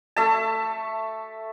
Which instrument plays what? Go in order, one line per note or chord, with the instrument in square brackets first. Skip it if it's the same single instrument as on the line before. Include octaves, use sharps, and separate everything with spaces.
[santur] A3 E5 A5